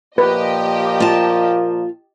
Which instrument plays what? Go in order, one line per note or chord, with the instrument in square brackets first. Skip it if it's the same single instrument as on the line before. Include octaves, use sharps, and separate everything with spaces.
[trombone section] A#2 F3 A#3 [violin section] G4 D#5 [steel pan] B4
[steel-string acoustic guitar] F4 A5